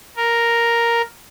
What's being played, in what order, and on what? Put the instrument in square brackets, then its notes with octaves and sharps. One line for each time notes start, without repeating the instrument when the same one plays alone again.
[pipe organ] A#4